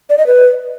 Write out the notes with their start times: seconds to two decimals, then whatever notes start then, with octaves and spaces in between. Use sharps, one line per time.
0.10 D5
0.18 D#5
0.27 B4